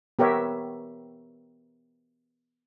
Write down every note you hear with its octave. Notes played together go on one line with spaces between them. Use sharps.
B3 G4 A#4 C#5 E5